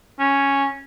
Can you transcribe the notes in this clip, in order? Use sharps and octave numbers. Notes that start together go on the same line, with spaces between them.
C#4